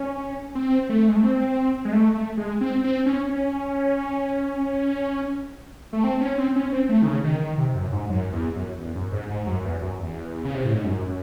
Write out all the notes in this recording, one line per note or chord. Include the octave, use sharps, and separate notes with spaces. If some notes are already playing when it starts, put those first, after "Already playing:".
Already playing: C#4
C4
A3
G#3
A3
C4
G#3
A3
A3
G#3
C4
C4
C#4
C#4
A3
C4
C#4
C4
C#4
C4
A3
D#3
C#3
D#3
D#3
C3
F#2
G#2
F#2
E2
F#2
E2
F#2
G#2
G#2
F#2
E2
F#2
E2
C#3
C3
A2
G#2
F#2